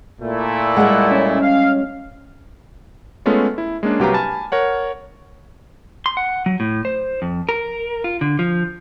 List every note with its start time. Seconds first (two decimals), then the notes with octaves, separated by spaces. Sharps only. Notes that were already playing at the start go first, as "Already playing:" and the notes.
0.21 A#2 A3 E4
0.77 G3 G#3 F#5
1.11 C#4
1.41 F5
3.26 G#3 A3 B3 C#4 F4 A4
3.58 E4
3.83 G#3 A#3 C#4 D4
3.99 C2 F#3 G4 B4 F5 A#5
4.14 G#5 A5 B5 F6 A6
4.52 A#4 C#5 F#5
6.06 C6
6.17 F#5
6.46 F#3
6.60 A2
6.85 C5
7.22 F2
7.49 A#4
8.04 F4
8.21 D3
8.39 F3